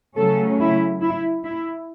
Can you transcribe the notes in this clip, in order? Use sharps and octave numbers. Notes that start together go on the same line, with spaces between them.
C#3 F#3 A3 C#4 A4
E4
E4
E4